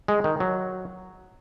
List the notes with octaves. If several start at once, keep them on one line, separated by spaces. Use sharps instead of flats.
G#3
D#3
F#3